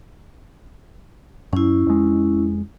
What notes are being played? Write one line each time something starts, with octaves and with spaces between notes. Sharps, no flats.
F#2 C#4 E4
F2 G#3